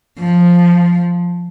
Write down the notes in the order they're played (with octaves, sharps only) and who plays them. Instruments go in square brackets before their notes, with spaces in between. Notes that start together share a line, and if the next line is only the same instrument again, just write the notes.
[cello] F3